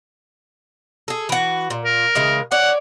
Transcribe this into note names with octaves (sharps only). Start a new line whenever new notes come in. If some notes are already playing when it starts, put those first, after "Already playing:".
G#4 A4
E3 F#4
A#2
A#4
C#3 E3 G#3
C#5 D5 F#5